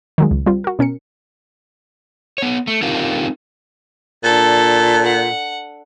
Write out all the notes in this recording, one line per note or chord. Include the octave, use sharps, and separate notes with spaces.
D#3 F#3 G#3
C#2
G3 C4 F4
F#4 A#4
B2 C#4 A#4 C#7
B3 C#5
A3
C4 D4 D#4 F4 G4 A#4
A#2 D4 A4
F#5